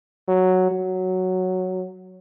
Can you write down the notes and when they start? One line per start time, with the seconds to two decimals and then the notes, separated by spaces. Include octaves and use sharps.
0.28 F#3
0.71 F#3